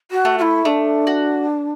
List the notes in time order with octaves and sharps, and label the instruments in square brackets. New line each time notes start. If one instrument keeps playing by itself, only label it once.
[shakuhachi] F#4
[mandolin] A3
[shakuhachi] F#4
E4
[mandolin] A3 [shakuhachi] D4
[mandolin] F#4